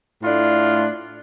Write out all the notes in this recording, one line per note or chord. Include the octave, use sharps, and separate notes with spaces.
A2 A3 D4 F4